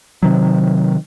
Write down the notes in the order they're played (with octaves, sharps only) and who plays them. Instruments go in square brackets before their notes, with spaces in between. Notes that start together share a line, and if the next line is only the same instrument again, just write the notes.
[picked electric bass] C3 D#3 F#3